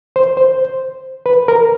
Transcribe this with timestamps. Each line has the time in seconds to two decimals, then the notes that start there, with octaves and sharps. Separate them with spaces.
0.16 C5
0.37 C5
1.26 B4
1.48 A#4